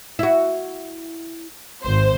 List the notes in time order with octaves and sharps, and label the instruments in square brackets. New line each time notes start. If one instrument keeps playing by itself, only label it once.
[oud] E4 F#4
[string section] G#1 C5